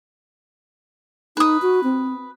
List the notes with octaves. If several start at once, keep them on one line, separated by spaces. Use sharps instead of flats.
D#4 B4 D#6
F#4
C4